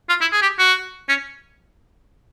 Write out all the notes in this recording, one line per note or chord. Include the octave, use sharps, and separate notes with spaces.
F4
E4
G#4
G4
F#4
C#4